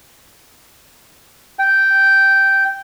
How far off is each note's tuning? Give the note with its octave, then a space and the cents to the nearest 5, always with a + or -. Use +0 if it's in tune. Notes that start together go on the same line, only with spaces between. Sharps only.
G5 -10